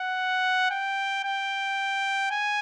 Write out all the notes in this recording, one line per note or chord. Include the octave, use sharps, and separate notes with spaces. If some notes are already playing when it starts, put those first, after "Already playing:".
Already playing: F#5
G5
G5
G#5